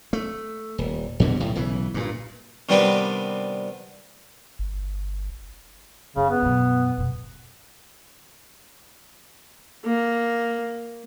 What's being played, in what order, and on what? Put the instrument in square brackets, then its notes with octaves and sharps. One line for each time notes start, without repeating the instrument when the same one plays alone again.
[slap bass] A3
D#1
E2 G2 B2 D3
B1 A2
B1 C#3 E3
G2 A#2
[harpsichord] C3 D#3 G3 B3 C4 D4
[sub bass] G1
[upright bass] F#1 [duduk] C#3
[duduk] B3
[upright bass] F#2 B2
F2 B2
[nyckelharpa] A#3